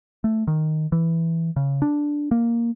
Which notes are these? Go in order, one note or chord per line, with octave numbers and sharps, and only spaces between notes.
A3
D#3
E3
C#3
D4
A#3